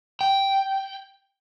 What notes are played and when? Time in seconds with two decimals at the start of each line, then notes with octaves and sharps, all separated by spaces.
0.21 G5